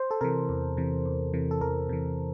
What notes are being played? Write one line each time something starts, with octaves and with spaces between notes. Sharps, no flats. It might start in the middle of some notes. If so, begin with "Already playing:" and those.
Already playing: C5
A4
C3 E3 A#4
E2
C3 E3
E2
C3 E3
A4
E2 A#4
C3 E3